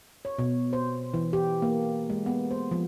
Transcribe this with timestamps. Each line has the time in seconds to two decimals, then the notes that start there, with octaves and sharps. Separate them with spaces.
0.25 C#5
0.38 B2
0.73 C5
1.14 E3
1.33 G4
1.62 A#3
2.10 G#3
2.26 B3
2.51 C5
2.71 F3